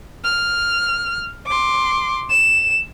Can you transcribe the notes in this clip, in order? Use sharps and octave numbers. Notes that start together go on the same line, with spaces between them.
F6
C6 D6
E7